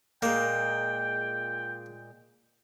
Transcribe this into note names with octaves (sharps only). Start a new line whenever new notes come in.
A#2 G#3 A#3 G5